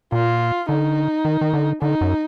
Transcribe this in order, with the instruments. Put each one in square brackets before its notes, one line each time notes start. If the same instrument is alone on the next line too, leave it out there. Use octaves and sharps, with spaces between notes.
[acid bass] A#2 [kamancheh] F4
[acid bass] D3 [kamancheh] D#4
[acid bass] D#3
D#3
D3
[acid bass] D3 [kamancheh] D#4
[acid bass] F#2